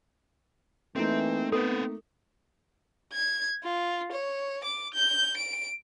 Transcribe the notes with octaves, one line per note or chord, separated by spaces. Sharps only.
E3 A3 A#3 C4 D#4
B3 C4 A4 B4
G#6
F4
C#5
D6
G6
D7